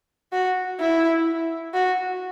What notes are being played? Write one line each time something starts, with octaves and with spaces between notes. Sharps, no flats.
F#4
E4
F#4